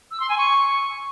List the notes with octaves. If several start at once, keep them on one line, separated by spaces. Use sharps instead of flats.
E6
C6
G#5
C#6